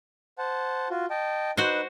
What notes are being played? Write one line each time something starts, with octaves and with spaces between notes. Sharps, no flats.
C5 F#5 A5
F4 F#4
D#5 G5 A5
D#4 F#4 B4 C5